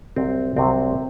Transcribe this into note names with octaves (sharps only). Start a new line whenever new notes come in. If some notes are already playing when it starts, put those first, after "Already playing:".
C2 C3 F#3 C4
C2 C3 F#3 C4